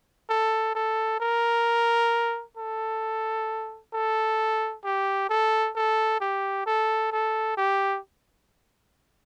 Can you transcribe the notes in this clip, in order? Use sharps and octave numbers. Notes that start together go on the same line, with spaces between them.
A4
A4
A#4
A4
A4
G4
A4
A4
G4
A4
A4
G4